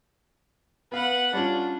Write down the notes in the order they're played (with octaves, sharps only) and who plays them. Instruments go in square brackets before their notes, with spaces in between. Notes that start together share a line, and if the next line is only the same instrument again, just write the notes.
[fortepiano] B3 F5 [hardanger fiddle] B4 F#5
[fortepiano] G3 C#4 F4 [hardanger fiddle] D4